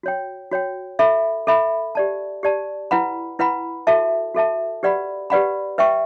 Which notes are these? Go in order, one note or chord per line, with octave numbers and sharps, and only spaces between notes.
F#4 C#5 G5
F#4 C#5 G5
A4 E5 B5
A4 E5 B5
G4 D5 A5
G4 D5 A5
E4 B4 F#5 B5
E4 B4 F#5 B5
F#4 A4 E5 A5
F#4 A4 E5 A5
G4 B4 D5 F#5 B5
G4 B4 D5 F#5 B5
B4 E5 G5 C#6